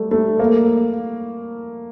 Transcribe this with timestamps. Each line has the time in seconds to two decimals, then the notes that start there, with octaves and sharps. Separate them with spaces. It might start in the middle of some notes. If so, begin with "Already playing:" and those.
Already playing: G3 A3
0.11 A3
0.39 A#3